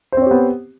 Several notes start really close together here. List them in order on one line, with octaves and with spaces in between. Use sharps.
C5 C4 C#5 G4 B3